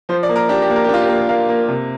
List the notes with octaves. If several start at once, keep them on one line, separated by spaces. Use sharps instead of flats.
F3 C5
D5
A#3
A#4
D4 G4
G4
A#3
A#4
G4
D4 F4
G4
A#3
A#3 F5
A#3
C3